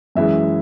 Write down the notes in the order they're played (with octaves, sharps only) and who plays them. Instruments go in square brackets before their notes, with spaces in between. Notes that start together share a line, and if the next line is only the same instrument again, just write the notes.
[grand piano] F#2 E3 G#3 E5